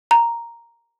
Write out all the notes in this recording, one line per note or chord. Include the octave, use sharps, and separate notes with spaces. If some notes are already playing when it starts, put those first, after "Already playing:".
A#5